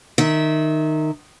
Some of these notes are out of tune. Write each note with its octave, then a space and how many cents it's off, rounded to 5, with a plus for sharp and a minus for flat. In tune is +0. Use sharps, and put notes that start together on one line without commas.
D#3 -15 E5 -25